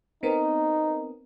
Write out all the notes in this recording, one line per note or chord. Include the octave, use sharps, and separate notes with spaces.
B3 C4 D#4 A#4